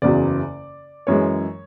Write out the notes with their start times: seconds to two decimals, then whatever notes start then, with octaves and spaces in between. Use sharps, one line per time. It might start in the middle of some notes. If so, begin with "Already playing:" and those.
0.02 F#1 E2 C#3 F#3 D5
1.07 F#2 E3 G#3 C#5